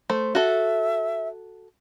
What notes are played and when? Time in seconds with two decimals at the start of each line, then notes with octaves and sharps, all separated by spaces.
0.10 A3 C5
0.35 F#4 A4 E5